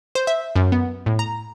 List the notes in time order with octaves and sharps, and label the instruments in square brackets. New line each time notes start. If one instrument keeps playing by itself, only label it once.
[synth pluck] C5
E5
F#2
B3
A2
A#5